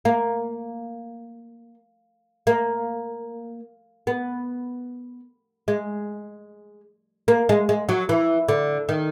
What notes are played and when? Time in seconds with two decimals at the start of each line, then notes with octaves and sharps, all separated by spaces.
0.05 A#3
2.47 A#3
4.07 B3
5.68 G#3
7.28 A#3
7.49 G#3
7.69 G#3
7.89 F#3
8.09 E3
8.49 D3
8.89 D#3